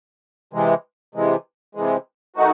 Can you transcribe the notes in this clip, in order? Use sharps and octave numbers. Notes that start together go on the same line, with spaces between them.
C3 E3 G#3
C3 E3 G#3
C3 E3 G#3
D#3 A3 D#4 F#4